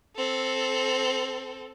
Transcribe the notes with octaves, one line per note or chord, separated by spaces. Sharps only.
C4 A4